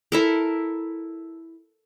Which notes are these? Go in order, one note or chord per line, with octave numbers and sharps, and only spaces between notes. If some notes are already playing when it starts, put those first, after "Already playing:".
E4 A4 A#4